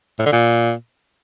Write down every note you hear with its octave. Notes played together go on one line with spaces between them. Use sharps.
A2
D3
A#2